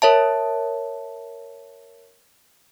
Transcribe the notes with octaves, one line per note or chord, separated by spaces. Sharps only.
A#4 C#5 E5 A5